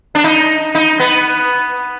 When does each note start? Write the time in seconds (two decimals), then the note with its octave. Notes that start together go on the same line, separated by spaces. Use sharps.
0.15 D4
0.24 D#4
0.75 D#4
1.00 B3